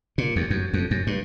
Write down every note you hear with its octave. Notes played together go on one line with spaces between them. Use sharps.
A#2
D#2
F#2
F2
F#2
G2